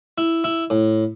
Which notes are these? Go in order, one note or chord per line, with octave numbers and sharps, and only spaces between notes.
E4
E4
A2